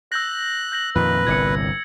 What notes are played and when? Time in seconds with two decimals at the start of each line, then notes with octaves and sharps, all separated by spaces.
0.12 E6 F#6 G6 A#6
0.72 G6 A#6 F#7
0.95 F2 A#2 D#3 B4
1.27 G1 C2 A#2 G#6 C#7